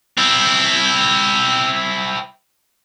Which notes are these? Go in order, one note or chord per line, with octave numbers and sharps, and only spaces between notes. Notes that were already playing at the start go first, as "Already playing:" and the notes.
C4 E4